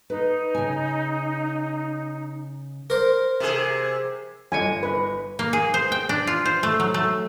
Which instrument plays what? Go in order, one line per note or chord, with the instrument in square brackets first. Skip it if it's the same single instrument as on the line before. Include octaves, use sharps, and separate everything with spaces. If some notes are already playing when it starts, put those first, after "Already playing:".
[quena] D#4 [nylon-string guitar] B4
[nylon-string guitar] C#3 G#5
[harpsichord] A#4 C5
[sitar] C3 G#4
[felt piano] G1 D#5 C#7 [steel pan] G#5
[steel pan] B4
[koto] A#3
G#4
C5
G5
D4
F4
C5
A3
F#3
A3